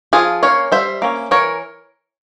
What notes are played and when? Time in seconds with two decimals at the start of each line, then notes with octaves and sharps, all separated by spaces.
0.13 F3 F4 G#4
0.43 A#3 C#4 C#5 F5
0.72 G3 C5 E5
1.02 A#3 C#4
1.31 E3 A#4 C#5